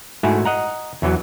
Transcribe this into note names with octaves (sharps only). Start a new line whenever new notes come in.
G#2 A3 E4 F#4 G#5
D#5 F#5 A#5
E2 E3 F#3